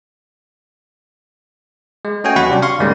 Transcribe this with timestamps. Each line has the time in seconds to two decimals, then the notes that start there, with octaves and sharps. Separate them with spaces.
2.05 G#3
2.24 A3 C#4 F#4 D#5 G5 G#5
2.36 D#2 F#3 F#4 F#5 B5 C#6
2.49 C3 G3 C#4 D4 F#4 G4
2.62 F5 C6 C#6
2.79 D2 G#2 G3 G#3 A#3 C#4